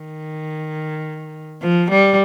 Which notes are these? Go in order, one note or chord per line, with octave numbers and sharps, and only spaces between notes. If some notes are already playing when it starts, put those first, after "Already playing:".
Already playing: D#3
F3
G3